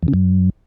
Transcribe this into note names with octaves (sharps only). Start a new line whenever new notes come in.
E2
C#3
F#2